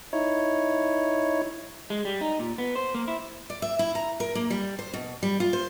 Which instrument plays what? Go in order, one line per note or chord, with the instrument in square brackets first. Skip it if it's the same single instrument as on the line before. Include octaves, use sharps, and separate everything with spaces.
[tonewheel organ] D#4 E4 C#5
[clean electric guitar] G#3
G3
D#4
A#2
B3
C5
A#3
E4
[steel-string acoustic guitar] D5
E5
E4
A#5
A#4
A#3
G3
C5
B2
G3
F4
C5